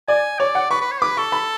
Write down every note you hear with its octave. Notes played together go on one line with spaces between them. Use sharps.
D5 G#5
C#5 D5
F#5
B4 C#6
B4
C#5
B4 D6
A4 C#6
B5